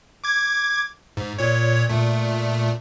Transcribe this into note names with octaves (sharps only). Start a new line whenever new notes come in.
D6 G#6
G#2
A#2 C#5
A#2 A3